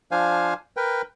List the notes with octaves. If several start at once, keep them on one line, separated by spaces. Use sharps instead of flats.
F3 D4 C5 F5 G#5
A#4 B4 G5